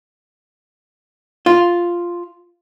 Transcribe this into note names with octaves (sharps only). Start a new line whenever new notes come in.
F4